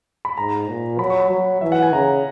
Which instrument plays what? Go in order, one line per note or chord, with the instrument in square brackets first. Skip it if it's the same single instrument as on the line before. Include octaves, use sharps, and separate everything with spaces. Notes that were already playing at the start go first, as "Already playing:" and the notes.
[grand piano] B5
[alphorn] G#2 [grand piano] A#5
[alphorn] A#2
[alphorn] F#3 [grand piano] B5
[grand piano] C#6
B5
[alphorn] F#3
[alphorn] E3 [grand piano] E5
[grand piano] F#5
G#5
[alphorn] C#3 [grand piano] A#5